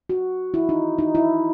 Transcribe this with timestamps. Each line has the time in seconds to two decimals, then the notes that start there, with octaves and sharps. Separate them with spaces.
0.09 F#4
0.54 E4
0.69 D#4
0.98 D#4
1.15 E4